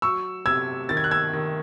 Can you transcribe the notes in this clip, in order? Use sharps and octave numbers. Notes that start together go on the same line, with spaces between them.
F#3 C#6 E6
C3 E6 G#6
D#3 A6
G#6
F#6
E6 G#6
D#3